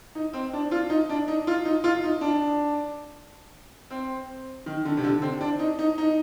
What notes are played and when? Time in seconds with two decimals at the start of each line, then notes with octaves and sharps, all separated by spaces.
0.15 D#4
0.33 C4
0.53 D4
0.71 F4
0.90 D#4
1.09 D4
1.28 D#4
1.47 F4
1.65 D#4
1.84 F4
2.04 D#4
2.21 D4
3.91 C4
4.66 D#3
4.85 D3
4.97 C3
5.04 D3
5.22 C4
5.41 D4
5.59 D#4
5.79 D#4
5.98 D#4